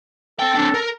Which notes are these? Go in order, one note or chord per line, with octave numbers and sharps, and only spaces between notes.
C4 A4 G5
C4 D4
A#4